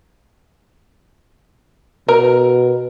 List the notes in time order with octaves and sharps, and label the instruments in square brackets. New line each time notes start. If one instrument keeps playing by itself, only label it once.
[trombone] B2 [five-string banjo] A#4 A#5